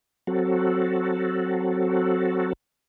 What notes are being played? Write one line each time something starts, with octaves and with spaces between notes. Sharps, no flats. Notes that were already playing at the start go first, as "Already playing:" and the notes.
F#3 C4 F#4 A4